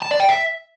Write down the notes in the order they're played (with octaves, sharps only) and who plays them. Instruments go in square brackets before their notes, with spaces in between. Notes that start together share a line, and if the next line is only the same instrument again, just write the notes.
[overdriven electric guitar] A5
D5
G5
E5